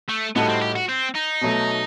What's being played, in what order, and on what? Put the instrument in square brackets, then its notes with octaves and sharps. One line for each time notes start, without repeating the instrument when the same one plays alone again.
[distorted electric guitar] A3
[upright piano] A2 G3 D#4 F#4 A4 [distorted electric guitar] B3
[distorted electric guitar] C4
G4
F#4
C4
D#4
[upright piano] B2 F#3 A3